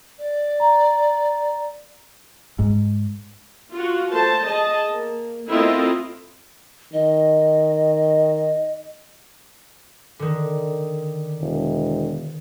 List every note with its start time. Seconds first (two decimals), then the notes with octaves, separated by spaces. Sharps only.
0.19 D5
0.60 A#5
2.59 G#2
3.71 F4 F#4
4.10 A3 C5 A5
4.45 G#4 D#5 A5
4.87 A#3
5.48 A3 C4 E4 F4 A#4 D#5
6.93 D#3 D#5
10.19 D3 D#3
11.41 E1